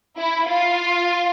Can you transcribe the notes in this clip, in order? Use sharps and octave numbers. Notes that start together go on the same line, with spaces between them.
E4
F4